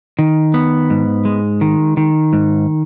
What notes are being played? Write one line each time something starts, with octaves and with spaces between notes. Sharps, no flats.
D#3
B3
G#2
G#3
D#3
D#3
G#2